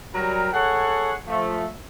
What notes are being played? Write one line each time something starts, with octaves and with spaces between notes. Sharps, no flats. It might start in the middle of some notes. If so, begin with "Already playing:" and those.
F#3 G3 A#4
G#4 A4 C#5 F#5
F3 A3